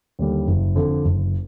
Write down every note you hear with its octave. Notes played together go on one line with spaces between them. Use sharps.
D#2 D3 G3
F#1
F2 D3
F#1